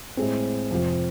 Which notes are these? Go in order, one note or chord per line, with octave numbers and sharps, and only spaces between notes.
A2 G#3 C4
F2 C3 F3